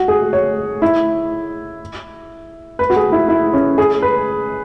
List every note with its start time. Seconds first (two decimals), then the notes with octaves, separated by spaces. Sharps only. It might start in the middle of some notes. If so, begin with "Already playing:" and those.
Already playing: F#4
0.08 G#4
0.33 C#5
0.82 E4
2.79 B4
2.90 F#4
2.96 G#4
3.12 E4
3.29 E4
3.53 C#4
3.78 G#4
4.02 B4